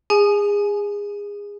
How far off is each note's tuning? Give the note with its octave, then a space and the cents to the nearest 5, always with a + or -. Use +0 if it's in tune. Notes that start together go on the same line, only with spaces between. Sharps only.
G#4 -25 G#5 +25